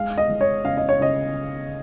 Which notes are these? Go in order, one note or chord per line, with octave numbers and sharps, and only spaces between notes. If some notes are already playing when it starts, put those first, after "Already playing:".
Already playing: G#3 F5
D#5
G#3
C#5
C#3 F5
D#5
C#5
C#3 D#5